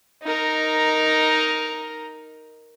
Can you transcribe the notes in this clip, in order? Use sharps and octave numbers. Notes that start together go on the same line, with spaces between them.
D#4 A#4